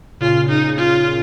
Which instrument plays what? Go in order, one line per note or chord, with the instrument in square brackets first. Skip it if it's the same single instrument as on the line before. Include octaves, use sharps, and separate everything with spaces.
[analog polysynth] A#2 C#3 [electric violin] F4
[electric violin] D#4
F4